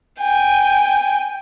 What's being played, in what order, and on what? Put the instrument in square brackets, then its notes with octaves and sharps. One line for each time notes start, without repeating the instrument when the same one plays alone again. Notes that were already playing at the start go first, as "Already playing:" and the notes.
[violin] G5 G#5